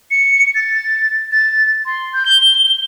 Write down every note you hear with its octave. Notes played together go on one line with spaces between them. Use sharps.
C#7
A6
A6
C6
G6
G7